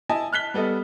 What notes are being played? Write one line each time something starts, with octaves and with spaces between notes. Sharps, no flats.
E4 D#5 G#5 A5
F6 F#6 B6 G7
G3 B3 A4 D#5